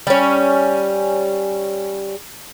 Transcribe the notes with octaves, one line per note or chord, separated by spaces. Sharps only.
G3 C#4